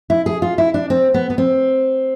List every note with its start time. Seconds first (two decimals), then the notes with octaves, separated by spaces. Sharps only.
0.10 E4
0.26 G#4
0.42 F4
0.58 E4
0.74 D4
0.90 C4
1.14 B3
1.30 B3
1.38 C4